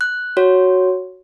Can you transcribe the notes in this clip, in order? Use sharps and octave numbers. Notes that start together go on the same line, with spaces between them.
F#6
F#4 C#5